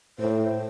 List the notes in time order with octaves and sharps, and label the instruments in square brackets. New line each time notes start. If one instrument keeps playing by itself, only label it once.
[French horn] A2 [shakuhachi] C5